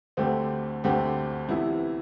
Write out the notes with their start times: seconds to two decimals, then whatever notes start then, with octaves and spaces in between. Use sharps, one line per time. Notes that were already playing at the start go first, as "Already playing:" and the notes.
0.17 D2 D3 A3 C4 G4
0.84 D2 D3 A3 C4 G4
1.49 C2 C3 E3 B3 E4